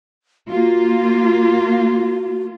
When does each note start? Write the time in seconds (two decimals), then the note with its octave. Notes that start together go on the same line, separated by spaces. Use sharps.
0.50 A#3 F4 F#4